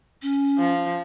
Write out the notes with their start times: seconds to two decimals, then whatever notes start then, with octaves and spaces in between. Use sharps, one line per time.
0.22 C#4
0.59 F3